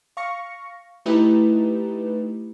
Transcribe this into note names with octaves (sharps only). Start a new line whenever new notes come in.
F5 C#6 A#6 C#7
A3 D#4 E4 G4 B4